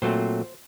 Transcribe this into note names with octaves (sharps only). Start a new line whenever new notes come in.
A#2 F#3 A3 C4 C5